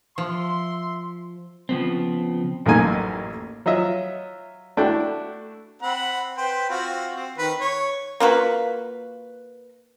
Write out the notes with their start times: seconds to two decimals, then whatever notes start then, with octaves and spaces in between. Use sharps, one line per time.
0.18 F3 E5 C6
1.69 C#3 F3 B3 C4
2.66 A1 F#2 A3 A#3 D#4 G#5
3.66 F#3 F4 D#5 E5
4.77 A3 D4 E4 F#4 G5
5.82 C4 F#5 B5
6.37 B4 C5 G5
6.70 C4 F4 F#4
7.15 C4
7.38 D#3 B4
7.60 C#5
8.20 A#3 F4 F#4 B4